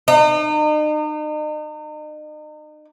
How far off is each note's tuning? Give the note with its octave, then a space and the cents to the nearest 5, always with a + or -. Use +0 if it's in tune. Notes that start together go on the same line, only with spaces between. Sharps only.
D#4 -40